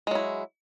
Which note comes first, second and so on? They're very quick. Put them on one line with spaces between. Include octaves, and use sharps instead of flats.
G#3 F#3 E4